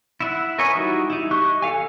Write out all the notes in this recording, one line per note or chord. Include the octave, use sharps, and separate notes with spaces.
E4 E5 F#5
A#4 B4 C#5 D#5 G#5
G3 D#4 E4 F#4
D#4 E4
G4 D#5 C#6 F#6
A4 F5 G#5